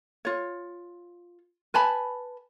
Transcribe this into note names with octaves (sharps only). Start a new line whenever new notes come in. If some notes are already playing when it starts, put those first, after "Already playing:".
F4 C#5
B4 G#5 A5 B5